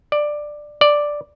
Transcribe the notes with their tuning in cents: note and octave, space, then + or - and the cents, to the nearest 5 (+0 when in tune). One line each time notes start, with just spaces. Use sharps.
D5 +10
D5 +0